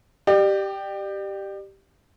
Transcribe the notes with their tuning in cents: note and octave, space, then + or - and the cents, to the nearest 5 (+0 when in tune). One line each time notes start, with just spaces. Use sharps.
G4 -5 D5 +35